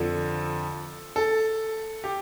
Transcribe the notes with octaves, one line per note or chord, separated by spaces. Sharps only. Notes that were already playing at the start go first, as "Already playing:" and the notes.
Already playing: F2 D3 F3 A4
A4
G4